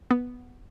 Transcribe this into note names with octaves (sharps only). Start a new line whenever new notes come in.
B3